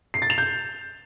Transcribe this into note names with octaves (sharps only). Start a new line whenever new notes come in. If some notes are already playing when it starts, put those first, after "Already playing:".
C7
A6
F7
G6